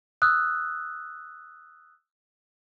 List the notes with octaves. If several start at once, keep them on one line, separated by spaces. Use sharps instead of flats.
D#6 E6 F#6